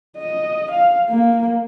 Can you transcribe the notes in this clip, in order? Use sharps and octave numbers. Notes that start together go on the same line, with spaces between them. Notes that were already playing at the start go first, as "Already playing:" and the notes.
D#5
F5
A#3